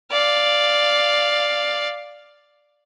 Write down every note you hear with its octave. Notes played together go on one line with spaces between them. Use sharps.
D5 F5